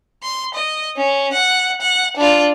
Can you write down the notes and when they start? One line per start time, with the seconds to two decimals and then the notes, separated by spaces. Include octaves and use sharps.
0.23 C6
0.54 D#5
0.97 C#4
1.33 F#5
1.82 F#5
2.17 D4 F4